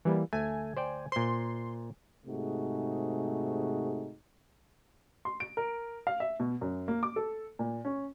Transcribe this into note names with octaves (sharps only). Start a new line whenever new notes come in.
E3 G3 A#3
D2 A3 G#5
C5 D5 G5
A#2 C5 C6
G#2 C3 A3 D#4 F#4 G#4
C6
D7
A#4
F5
E5
B2
F#2
A#3
D6
A4
A#2
C#4